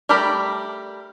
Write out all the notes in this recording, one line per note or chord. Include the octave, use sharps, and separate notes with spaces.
G3 A3 G4 A#4 B5